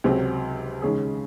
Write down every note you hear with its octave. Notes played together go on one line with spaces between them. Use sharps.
C#2 C3 F#3 C4
D#2 C#3 G#3 C#4 G#4